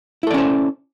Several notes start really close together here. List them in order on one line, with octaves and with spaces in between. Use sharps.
E4 A4 D5 C#4 C5